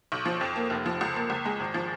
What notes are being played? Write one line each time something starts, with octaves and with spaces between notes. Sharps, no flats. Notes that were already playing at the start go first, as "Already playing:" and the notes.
B1
F3
F2
A#3
F1
F3
C#2
A#3
C#2
G#3
G#1
F3